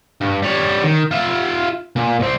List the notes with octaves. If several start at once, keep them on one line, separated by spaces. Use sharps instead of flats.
G2
G3 C#5
D#3
F4 E5
A#2
C2 C4